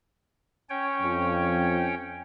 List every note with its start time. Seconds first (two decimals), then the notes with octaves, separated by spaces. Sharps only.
0.70 C#4 C#5 G5
1.01 F2